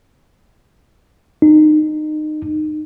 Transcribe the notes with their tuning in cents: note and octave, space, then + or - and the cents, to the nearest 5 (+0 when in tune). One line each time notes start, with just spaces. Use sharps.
D#4 -25